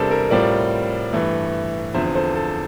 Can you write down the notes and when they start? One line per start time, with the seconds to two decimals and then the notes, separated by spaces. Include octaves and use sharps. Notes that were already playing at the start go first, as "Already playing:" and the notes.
Already playing: E2 C3 G3 D4 A4 A#4 C5
0.11 A#4
0.30 A2 G3 C4 F4 A#4 D5
1.13 G2 E3 A3
1.94 E2 D3 F3 C4 C5 E5
2.15 A4 C5
2.35 A4